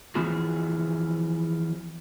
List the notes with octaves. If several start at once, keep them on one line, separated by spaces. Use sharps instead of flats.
E3 F3 B3 F4 F#4 G#4